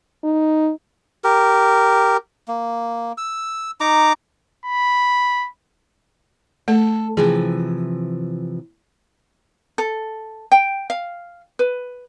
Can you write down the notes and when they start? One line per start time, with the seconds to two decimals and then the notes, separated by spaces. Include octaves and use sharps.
0.24 D#4
1.24 G4 A#4
2.48 A#3
3.18 E6
3.80 D#4 A#5 D6
4.66 B5
6.68 A3 A4
7.17 C3 E3 F3 G#4
9.78 A4
10.52 G5
10.90 F5
11.59 B4